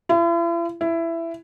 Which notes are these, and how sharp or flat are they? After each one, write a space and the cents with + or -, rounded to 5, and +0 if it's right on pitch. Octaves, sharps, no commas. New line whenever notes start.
E4 +45
E4 +15